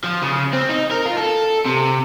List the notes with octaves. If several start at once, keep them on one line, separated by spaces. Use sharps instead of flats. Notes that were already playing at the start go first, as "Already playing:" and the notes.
F3
C#3
C4
D#4
A#4
F4
A4
C3